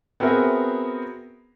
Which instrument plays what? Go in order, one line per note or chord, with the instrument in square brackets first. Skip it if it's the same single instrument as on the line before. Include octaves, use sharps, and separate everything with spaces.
[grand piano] B3 C4 F#4 G#4 A#4 E5